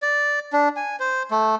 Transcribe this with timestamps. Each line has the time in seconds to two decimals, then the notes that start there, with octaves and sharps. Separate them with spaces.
0.02 D5
0.53 D4
0.76 G#5
1.00 C5
1.31 A3